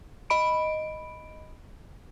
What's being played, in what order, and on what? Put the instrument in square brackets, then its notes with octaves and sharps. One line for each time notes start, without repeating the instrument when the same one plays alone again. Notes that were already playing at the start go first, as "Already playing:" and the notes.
[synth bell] D#5 B5 D7